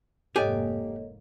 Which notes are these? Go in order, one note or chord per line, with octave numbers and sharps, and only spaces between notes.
F1 G#2 A#3 G4 A4 C#5 D#5 G#5